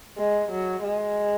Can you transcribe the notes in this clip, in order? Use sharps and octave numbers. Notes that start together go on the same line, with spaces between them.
G#3
F#3
G#3